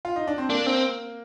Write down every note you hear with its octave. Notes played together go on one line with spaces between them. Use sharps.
F4
D#4
D4
C4
A#3 D4
C4